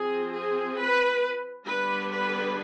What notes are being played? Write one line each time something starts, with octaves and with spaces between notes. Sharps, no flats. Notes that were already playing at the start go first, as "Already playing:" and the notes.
Already playing: F3 C4 G#4
G#4
B4
D3 G3 B3 D4 B4
B4